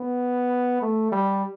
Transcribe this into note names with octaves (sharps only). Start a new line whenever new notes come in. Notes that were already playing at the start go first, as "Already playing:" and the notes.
Already playing: B3
A3
G3